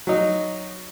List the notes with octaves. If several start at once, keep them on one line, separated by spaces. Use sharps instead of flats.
F#3 D#4